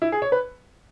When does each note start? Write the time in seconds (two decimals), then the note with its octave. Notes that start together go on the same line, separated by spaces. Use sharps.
0.02 E4
0.12 G#4
0.22 C#5
0.32 B4